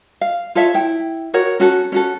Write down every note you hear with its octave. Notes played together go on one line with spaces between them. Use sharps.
F5
F4 A4 C#5 E5
E4 G5
F#4 A#4 C#5 F#5
C#4 F#4 A4
C#4 F#4 A4